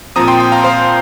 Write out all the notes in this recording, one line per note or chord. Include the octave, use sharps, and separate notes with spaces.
A#2 F3 C4 A#5 D#6
G5 C6
G5 C6
F5 A#5
C5 F5